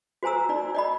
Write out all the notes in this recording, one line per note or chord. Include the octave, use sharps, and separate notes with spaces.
F#4 C5 G#5 A#5 E6
D#4 D5
D5 D#5 B5